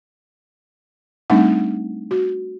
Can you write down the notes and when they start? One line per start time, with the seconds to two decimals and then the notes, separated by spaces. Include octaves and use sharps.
1.30 G3 A3 C4 D4 D#4 F#5
2.11 F#4